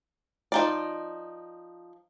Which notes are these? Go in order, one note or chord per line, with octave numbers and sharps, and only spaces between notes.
F3 D#4 D5